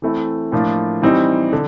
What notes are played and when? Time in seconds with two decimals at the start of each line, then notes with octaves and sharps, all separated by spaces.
0.02 E3 A3 C4 E4
0.52 A2 F3 A#3 D4 F4
1.02 E3 G3 C4 D#4
1.53 D3